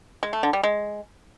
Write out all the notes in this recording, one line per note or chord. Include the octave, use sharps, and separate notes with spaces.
G#3
A3
D3
G3
G#3